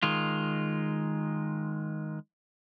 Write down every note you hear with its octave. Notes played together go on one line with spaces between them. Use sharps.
D#3 G#3 F4